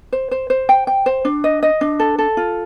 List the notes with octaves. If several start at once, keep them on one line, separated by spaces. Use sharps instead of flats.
C5
C5
C5
G5
G5
C5
D4
D#5
D#5
D4
A4
A4
F4